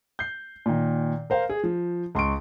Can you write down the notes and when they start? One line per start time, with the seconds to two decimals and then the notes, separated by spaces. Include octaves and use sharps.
0.19 G6 C7
0.66 A#2 D#3
1.30 A#4 C5 F5
1.49 G#4
1.64 F3
2.15 C#2 C6 C#6 D7